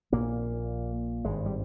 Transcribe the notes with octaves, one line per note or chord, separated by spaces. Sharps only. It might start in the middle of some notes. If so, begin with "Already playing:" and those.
A#1 A#2 A#3
G#1 G2 G#3
G3